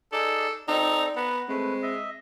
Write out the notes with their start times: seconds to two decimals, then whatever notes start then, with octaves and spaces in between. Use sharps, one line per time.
0.13 D#4 G#4 A4 D5
0.68 C4 D#4 A4 D5
1.16 B3 B4 F#5 A#5
1.49 G#3 A3 C4 B4
1.82 D#5 E5